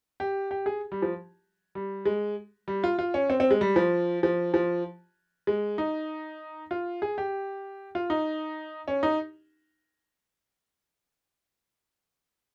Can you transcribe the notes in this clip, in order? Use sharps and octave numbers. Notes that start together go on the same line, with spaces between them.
G4
G4
G#4
G3
F3
G3
G#3
G3
F4
F4
C#4
C4
C4
G#3
G3
F3
F3
F3
G#3
D#4
F4
G#4
G4
F4
D#4
C#4
D#4